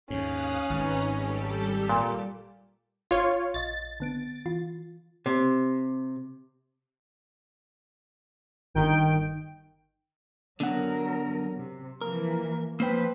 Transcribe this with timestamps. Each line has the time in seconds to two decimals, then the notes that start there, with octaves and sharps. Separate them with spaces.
0.10 D#2 G#2 C#4 F5 D#6 F#6
0.70 G#1 G#2 D#4 B4 A#5
1.14 G3 G4 A4
1.89 A#2
3.11 G1 F4 C#5 F5
3.54 A#1 D#5 A6
4.00 D3 B3 D7
4.46 E3 F4
5.26 C3
8.74 G1 D#3 G5 D7
10.60 D3 F#3 B3 A#4 F#5
11.55 C3
12.01 E3 F3 A#3 A#4
12.80 F3 A#3 B4 C5 G5